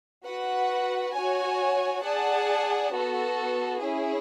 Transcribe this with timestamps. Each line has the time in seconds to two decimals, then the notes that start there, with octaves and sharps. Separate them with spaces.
0.24 F#4 B4 F#5
1.12 F#4 C#5 G#5
2.01 G#4 D5 F#5 A5
2.91 B3 F#4 A4
3.79 C#4 E4 G#4